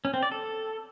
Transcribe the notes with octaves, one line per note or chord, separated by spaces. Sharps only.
C#4
C4
D5
A4